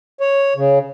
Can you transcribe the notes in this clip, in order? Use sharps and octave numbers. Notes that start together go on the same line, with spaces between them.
C#5
C#3